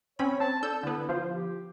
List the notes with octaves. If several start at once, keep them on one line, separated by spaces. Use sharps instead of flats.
C4 C#4 C#5 B5
C4 A5
D4 A4 E6 G6
D3 B3 E4
F3 F4 C5
G4